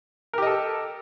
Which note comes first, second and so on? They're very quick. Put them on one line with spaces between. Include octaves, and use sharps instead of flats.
A#4 G4 D#5 A4